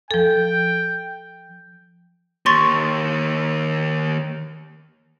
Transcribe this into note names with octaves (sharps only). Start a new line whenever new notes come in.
F3 A4 G5
D#2 C6 C#6 A6